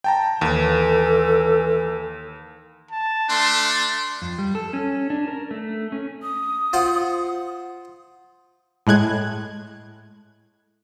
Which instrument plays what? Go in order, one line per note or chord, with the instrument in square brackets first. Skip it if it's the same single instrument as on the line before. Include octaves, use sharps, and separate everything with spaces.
[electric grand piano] G5 A5 A#5
[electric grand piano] D#2 [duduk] E3 [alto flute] A4
[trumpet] A5
[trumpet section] A3 D4 [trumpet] C6
[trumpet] C6
[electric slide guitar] F2
G3
A4
C#4
D4
A#4
A3
C#4
[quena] D#6
[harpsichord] F4 C5 F#5
[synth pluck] A2 G#3 F#6 G#6